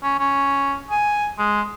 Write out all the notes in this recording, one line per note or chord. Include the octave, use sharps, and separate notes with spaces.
C#4
C#4
G#5
G#3